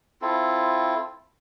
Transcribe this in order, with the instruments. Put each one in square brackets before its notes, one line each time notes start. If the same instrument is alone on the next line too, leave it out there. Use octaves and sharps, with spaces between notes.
[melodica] C4 E4 F4 A4